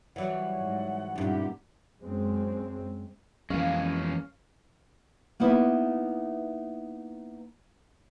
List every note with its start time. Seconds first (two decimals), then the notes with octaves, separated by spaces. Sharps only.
0.16 E3 F#3 G3 C#5 D5 E5 F#5
0.57 G#2
1.16 D2 G2 A#2 C#4 D#4 G4 E5
2.01 F#2 G#3 C4
3.50 F2 E3 G#3 A#3 C#4 F5
5.40 A#3 B3 D#4 E4 B4 E5